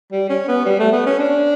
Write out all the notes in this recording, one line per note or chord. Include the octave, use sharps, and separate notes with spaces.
G3
C#4
B3
G3
A3
B3
C#4
D4